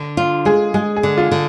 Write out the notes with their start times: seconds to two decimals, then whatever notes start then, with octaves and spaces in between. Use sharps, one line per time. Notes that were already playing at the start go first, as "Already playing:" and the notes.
Already playing: D3
0.17 F4
0.45 G#3 G#4
0.74 G#3 G#4
0.96 G#4
1.03 D3
1.17 F4
1.31 D3